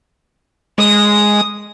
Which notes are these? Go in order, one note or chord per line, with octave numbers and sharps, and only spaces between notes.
G#3 D#6